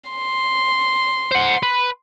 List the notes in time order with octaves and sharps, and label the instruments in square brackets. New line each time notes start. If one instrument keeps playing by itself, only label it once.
[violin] C6
[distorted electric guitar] C5 F#5
B4